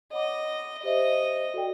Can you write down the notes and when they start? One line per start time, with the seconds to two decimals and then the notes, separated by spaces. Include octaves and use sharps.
0.12 C#5 D#5 F#5 B5 D6
0.83 G4 C5 D#5 E5
1.54 F#4 A4 D5 G5